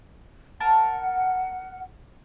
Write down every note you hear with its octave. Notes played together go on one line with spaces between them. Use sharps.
A#4 F#5 A5